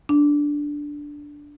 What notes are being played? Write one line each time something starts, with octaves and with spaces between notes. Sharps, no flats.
D4